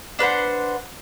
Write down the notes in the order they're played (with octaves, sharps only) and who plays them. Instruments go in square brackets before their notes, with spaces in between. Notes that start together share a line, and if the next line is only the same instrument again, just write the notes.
[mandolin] D4 B4 C5 F#5